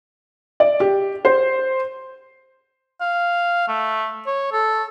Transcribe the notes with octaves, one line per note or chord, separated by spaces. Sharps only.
D5
G4
C5
F5
A3
C#5
A4